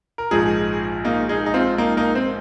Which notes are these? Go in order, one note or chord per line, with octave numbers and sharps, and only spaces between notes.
A#4
A#1 G#2 F3 D#4 G#4
A#3 D#4
D#4 G#4
D#4
C4 F4
A#3 D#4
A#3 D#4
C4